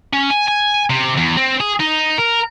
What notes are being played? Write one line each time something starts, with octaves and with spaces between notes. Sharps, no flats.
C#4
G#5
G#5
C3
E2
C4
G#4
D#4
A#4